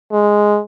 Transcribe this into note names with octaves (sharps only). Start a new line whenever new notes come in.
G#3